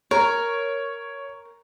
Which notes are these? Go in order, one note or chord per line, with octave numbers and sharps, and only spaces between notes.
A#4 C#5